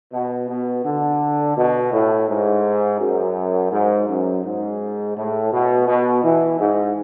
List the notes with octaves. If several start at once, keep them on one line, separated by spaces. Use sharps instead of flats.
B2
B2
D3
B2
A2
G#2
F#2
G#2
F#2
G#2
A2
B2
B2
E3
G#2